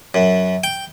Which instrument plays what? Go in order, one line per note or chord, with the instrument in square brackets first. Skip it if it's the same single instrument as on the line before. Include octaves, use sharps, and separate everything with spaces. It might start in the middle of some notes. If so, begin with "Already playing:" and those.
[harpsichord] F#2
G5